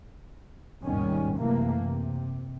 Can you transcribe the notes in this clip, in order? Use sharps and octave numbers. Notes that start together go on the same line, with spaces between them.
D#2 G#2 B2 D#3 G3 C#4
F#2 C3 E3 A3 A#3
C3